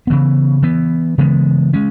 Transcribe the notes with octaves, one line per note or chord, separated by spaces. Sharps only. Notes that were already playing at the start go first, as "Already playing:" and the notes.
C#3 E3 B3
E3 B3
C#3 E3 G#3 B3
G#3 C#4